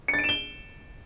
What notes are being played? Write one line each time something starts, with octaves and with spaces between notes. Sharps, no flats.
C#7
A6
D7
E7
G7